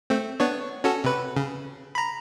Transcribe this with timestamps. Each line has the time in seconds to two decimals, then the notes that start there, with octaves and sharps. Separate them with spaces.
0.10 A3 C4
0.40 B3 D4 C#5
0.84 C#4 F#4 A4
1.04 C3 B4
1.36 C#3
1.95 A#5 B5